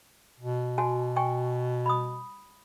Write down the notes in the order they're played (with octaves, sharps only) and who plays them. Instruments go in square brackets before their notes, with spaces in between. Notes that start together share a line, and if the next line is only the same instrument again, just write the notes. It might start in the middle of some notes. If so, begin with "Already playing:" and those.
[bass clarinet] B2
[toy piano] F#4 G#5 A5
G5 G#5 C#6
B5 D#6